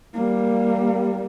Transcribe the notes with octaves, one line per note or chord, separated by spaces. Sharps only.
G3 A#3